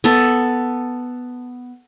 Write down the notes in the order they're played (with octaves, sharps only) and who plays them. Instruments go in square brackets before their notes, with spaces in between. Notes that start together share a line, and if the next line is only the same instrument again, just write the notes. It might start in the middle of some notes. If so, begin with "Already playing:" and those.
[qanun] B3 A4